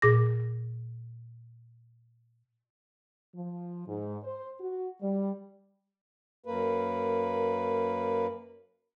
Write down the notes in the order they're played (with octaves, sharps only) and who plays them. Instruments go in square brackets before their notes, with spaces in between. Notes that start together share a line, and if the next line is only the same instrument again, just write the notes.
[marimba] A#2 G#4 D6 A#6
[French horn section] F3
G#2
C5
F#4
G3
[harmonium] F#2 A#3 B4